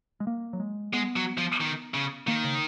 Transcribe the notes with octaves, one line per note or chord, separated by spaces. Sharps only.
G#3
A#3
F#3
G#3
G#3 B3
F#3
F3
D#3
C#3
D#3 A#3
C#3